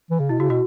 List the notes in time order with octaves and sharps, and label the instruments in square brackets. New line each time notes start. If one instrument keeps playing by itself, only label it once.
[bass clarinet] E3
C#3
[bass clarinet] B2 [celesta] E4
[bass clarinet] C#3 [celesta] F#4
[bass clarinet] B2 [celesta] F#4